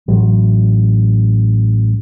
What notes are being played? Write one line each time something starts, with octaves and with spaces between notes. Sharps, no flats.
A1 F#3